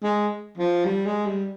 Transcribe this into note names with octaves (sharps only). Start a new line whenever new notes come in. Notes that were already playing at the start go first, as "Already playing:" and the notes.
G#3
F3
G3
G#3
G3